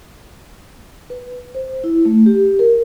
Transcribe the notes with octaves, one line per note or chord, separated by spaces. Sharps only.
B4
C5
E4
A3
G4
A#4